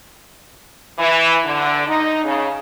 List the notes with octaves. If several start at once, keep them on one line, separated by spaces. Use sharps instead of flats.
E3
D3
D#4
C#3